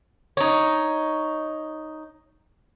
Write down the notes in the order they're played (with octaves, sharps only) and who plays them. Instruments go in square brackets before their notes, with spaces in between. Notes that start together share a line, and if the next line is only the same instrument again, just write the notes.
[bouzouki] D#4 C#5